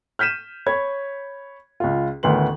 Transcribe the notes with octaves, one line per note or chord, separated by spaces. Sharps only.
F6 G6 B6 D#7 E7
C#5 B5 G#6
C#2 F4
A1 D2 D#3 B3 C6 F#7